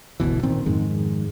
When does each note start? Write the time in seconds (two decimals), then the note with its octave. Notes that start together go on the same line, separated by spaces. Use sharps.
0.20 G1 D2 B2 E3
0.43 A#2 D#3 C4
0.66 F2 G#2 D#3 G#3